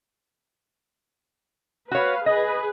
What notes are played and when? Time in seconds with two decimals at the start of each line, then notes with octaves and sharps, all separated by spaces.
1.91 F#4 B4 C#5 F5
2.26 G#4 B4 D#5